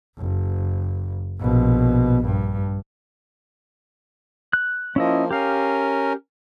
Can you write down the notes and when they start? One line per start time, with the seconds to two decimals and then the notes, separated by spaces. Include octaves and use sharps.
0.17 F#1
1.39 A#1 B2
2.25 G2
4.53 F#6
4.96 F3 A#3 C#4 E4 D#5
5.31 C#4 G4 A#4 F5